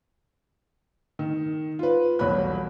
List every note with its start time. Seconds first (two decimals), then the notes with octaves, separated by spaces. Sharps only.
1.19 D#3
1.79 F4 B4
2.19 E1 B1 G3 C#5 B5 F#6